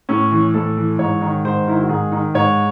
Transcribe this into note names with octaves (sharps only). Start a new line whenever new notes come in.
A2 C#4
E3
A2 A4
E3
G#2 C#5
D#3
G#2 C5
D#3 E4
F#4
G#2 G#4
D#3
G#2 C#5